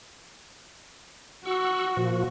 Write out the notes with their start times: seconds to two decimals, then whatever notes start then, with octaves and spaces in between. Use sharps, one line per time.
1.45 F#4 F#5 C#6 E6
1.97 A#2 F3